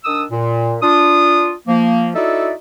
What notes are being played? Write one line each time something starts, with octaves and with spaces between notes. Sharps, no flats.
D#3 D4 D#6 E6
A#2
D4 F4 D#6
F3 A#3
D#4 E4 F#4 A4 D5 E5